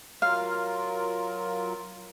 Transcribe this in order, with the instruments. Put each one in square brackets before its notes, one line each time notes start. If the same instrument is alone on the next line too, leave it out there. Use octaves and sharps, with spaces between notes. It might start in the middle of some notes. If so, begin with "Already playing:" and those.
[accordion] F#3 F4 A#4 [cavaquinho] F5